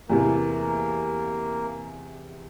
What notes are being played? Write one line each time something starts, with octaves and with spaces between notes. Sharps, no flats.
E2 C3 E3 A#3